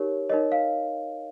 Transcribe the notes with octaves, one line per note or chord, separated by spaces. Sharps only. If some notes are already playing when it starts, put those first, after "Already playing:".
Already playing: D#4 G4 A#4 C#5
D#4 A#4 C#5 D#5
F5